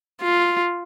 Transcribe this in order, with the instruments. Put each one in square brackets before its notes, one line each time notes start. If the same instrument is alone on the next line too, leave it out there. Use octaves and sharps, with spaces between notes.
[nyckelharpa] F4